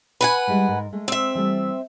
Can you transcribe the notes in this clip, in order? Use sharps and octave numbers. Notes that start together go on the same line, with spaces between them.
B4 F#5 G#5
G3 G#3 E4
G#2 A#4
G#3 A3
C4 E5
E3 G3 A3